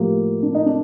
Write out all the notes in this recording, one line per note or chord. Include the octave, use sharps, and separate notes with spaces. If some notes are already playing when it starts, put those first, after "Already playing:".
Already playing: A2 F3 A#3 G4
D4
D#4
D4